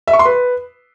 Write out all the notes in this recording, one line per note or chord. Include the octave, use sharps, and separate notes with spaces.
E5
C#6
C6
B4